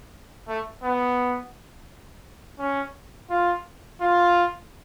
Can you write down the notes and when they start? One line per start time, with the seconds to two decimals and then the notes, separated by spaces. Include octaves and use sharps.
0.48 A3
0.83 B3
2.59 C#4
3.30 F4
4.01 F4